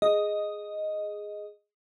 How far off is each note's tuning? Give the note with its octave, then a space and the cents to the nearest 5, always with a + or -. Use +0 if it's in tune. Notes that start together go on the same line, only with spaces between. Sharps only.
G#4 +0 D#5 +0